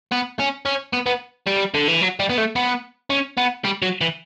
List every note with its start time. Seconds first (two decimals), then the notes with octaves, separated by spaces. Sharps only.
0.12 B3
0.39 C#4
0.65 C#4
0.93 B3
1.06 B3
1.47 G3
1.75 D3
1.88 E3
2.02 F#3
2.20 G3
2.30 B3
2.38 A3
2.56 B3
3.10 C#4
3.37 B3
3.64 G3
3.82 F#3
4.01 E3